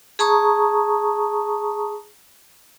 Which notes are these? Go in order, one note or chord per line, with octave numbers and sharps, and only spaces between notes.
G#4 A5 A#5 C#6 D#6